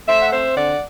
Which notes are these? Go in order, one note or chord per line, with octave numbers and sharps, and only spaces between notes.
A3 C5 E5
F#5
C4 C5 E5
D3 D5 F#5